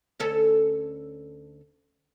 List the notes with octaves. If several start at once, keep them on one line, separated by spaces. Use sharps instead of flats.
D2 C#4 A4